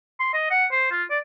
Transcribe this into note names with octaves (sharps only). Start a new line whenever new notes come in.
C6
D#5
F#5
C5
F4
D5